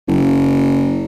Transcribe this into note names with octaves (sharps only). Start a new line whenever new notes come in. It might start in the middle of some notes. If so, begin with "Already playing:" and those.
F#1